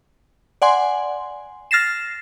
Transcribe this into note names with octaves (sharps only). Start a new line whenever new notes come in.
D5 F#5 G#5 C6
F6 A6 A#6 C7 E7